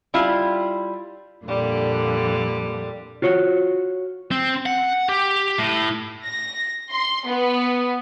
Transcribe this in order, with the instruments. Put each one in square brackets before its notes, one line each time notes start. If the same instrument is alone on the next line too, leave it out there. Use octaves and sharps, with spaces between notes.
[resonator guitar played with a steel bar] G3 E4 F4
[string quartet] F2 A#2 D3 G3
[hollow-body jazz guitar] F4 F#4 C#5
[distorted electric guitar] C4
F#5
G4
A2
[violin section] A#6
C6
B3